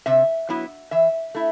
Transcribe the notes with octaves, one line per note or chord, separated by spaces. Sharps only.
C3 E5
F#3 B3 E4
E3 E5
A3 E4